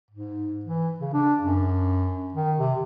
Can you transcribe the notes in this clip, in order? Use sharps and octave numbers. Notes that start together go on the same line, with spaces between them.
G#2
E3
C#3
D4
F#2
D#3
C3